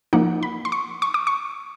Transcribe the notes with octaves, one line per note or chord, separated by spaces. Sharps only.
F3 A#3 D#4 F#5
B5
C6
C#6
C#6
D6
C#6